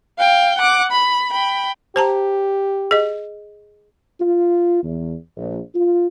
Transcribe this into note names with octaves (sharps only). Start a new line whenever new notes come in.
F5 G5
F#5 D6
B5
G5 B5
G4 C5 A5 A#5
G#4 D#5
F4
E2
A#1
F4